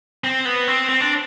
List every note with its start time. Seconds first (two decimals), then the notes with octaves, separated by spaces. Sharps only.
0.24 C4
0.45 B3
0.68 C4
0.89 C4
1.01 D4